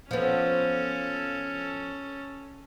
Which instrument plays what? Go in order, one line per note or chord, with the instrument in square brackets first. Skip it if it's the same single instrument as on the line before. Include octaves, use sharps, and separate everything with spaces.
[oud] F3 B3 [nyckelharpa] C#4 A4